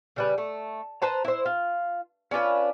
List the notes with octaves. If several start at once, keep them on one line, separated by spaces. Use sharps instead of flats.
C#3 G3 B4
A3
B4 C5 A5 A#5
E4 C5
F4
C#4 D4 F4 B4